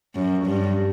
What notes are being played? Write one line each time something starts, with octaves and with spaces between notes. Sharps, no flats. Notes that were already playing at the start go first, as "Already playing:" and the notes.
F#2
G2